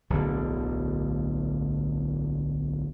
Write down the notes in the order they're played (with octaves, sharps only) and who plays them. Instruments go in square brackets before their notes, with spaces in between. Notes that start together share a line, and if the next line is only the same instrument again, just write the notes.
[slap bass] D1 B1 D3